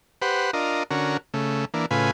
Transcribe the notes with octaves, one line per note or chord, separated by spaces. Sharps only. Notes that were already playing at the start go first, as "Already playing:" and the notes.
G4 B4 C5 F#5
D4 F4 A#4 D#5
D3 C#4 F#4 A#4
C#3 A3
E3 A#3 D4
A2 C#3 F4 B4 G#5